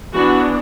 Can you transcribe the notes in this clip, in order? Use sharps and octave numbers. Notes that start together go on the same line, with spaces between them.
E3 B3 D4 F#4